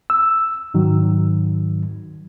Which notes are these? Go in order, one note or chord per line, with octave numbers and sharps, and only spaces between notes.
E6
G#2 D#3 F#3